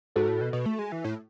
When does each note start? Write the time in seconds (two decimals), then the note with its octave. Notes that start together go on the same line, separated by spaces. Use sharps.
0.16 G#2 F#4 A4
0.28 A2
0.41 B2
0.53 B2
0.66 A3
0.79 G#3
0.92 E3
1.04 A2